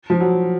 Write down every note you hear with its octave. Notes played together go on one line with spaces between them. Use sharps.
F3
F#3